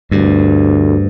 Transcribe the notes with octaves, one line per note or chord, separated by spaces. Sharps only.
D2 G2